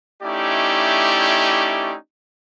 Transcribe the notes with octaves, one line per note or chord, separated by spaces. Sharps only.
A3 C#4 D#4 E4 G4 D5